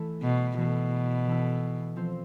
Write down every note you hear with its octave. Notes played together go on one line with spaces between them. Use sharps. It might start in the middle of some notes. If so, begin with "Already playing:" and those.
Already playing: E3 A3 E4
B2
B2 E3 A3 E4
E3 A3 E4
F3 C4 F4 C5